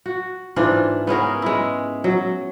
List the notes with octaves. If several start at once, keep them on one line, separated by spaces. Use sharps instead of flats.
F#4
G#2 E3 D4 F4
B3 C#4 G#4 A#4
G#3 E4
F#3